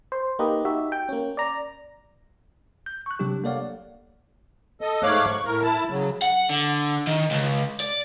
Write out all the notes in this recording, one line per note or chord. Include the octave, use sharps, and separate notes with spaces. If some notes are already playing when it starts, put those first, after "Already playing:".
C5
A#3 D#4 G4 B4 D#5
D#4 F#4 G4 E5
G5
A#3 C#4
D5 A#5
G6
C#6 F#6
C3 F#3 G3 D4 G4
A#3 A4 C#5 D5 F5 F#5
A4 D#5
G#2 A3 C#5 F5 D6 F#6
C#6
A2 A#4
E4 A5
C#3 F#3
F#5
D3
D#3
C#2
D5